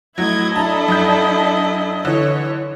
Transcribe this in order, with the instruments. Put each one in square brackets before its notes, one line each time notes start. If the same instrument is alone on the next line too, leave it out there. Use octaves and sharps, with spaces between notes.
[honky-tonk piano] A2 F#3 [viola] E4 D#5 [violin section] G#6
[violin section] D4 A4 [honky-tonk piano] A5 A#5
[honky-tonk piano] F#2 D#4 G6
[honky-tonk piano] D3 E3 [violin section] C#5